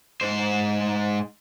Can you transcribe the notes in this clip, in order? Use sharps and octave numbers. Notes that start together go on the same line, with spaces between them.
G#2 C5